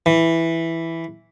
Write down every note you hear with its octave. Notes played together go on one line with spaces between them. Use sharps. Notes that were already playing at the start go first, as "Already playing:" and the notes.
E3